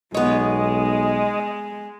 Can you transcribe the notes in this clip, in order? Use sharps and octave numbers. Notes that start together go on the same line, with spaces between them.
B1 G#3 B3 C#5 D#5